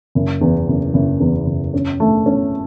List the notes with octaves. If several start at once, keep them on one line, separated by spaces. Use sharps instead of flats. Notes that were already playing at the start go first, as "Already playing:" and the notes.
F#1
E2
F#1
F#1
E2
F#1
C#4
A3
C#4